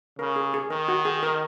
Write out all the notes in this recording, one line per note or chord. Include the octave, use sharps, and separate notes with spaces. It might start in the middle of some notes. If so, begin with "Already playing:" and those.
C#3 A#4
G#4
G#4
D#3 A#4
F#4
G#4
A#4